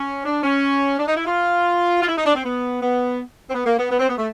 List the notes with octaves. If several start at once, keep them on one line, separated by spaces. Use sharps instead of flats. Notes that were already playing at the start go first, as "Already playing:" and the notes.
Already playing: C#4
D4
C#4
D4
D#4
E4
F4
F4
E4
D#4
D4
C4
B3
B3
C4
B3
A#3
B3
B3
C4
B3
A3